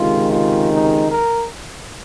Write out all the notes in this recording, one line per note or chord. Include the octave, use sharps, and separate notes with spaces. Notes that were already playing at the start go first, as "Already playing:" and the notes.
Already playing: C#2 C3 D#3 G#3 F4
F4
D#4
A#4